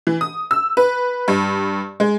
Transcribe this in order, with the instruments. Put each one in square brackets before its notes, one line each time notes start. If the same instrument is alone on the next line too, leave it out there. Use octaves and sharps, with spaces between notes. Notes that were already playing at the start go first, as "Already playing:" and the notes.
[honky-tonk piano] E3
D#6
E6
B4
G2
G#3